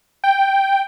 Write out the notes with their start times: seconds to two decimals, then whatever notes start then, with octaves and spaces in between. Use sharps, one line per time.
0.24 G5